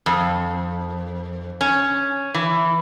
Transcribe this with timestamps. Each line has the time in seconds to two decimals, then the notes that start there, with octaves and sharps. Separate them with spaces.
0.06 F2
1.61 C#4
2.34 E3